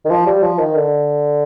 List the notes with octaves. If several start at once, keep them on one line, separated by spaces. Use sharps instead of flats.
D#3
F3
G3
F3
D#3
D3